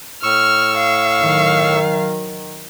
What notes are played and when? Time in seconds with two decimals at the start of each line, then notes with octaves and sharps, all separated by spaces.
0.23 A2 C#6 E6 F6
0.78 F5
1.22 D#3 F#3